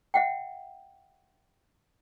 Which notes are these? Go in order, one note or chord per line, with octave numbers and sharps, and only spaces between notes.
E5 F#5 G5